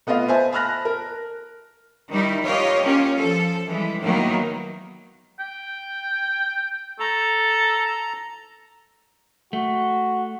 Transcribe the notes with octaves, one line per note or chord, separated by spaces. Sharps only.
A3 B3 F4 D#5 F5
C5 E5 G#5 A5
A5 B5 F6 F#6 A#6
A#4
D#3 G3 D#4 E4
F4 G4 A#4 C#5 D#5
A#3 C#4 F4 G4
F3 A4
E3 G3 G#3
A2 D#3 F#3 A#3 B3
G5
A4 A#5
A3 F#4